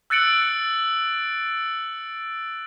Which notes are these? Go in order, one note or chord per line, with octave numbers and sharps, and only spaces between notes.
E6 F#6 A6 C#7 D7 F#7